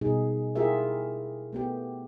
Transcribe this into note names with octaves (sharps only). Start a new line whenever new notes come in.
B2 G3 D#4 G#4
E4 F4 G4 G#4 A#4 E5
A3 B3 G4